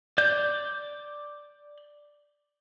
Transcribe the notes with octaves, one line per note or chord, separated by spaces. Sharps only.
D5 G6